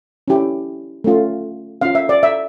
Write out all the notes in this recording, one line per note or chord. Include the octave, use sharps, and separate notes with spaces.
C#4 E4 G4
A3 C#4 F4
C#4 F4 F5
E5
D5
E5